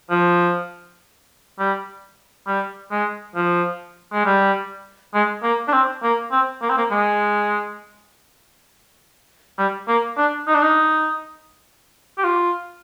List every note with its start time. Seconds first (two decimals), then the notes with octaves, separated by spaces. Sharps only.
0.10 F3
1.59 G3
2.47 G3
2.91 G#3
3.35 F3
4.13 G#3
4.25 G3
5.14 G#3
5.43 A#3
5.68 D4
5.73 C4
6.03 A#3
6.32 C4
6.62 A#3
6.70 C4
6.78 A#3
6.91 G#3
9.58 G3
9.88 A#3
10.18 D4
10.47 D#4
10.55 D4
10.63 D#4
12.18 G4
12.24 F4